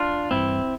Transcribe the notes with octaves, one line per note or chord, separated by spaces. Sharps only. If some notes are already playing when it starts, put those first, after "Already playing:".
Already playing: D4 F4
G2 E3 C4 E4